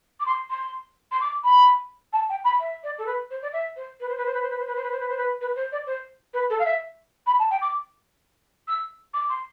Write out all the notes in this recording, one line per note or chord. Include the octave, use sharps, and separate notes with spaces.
D6
C6
C6
C6
D6
B5
A5
G5
B5
E5
D5
A4
B4
C5
D5
E5
C5
B4
C5
B4
C5
B4
C5
B4
C5
B4
C5
B4
C5
B4
C5
B4
B4
C5
D5
C5
B4
A4
F5
E5
B5
A5
G5
D6
E6
D6
C6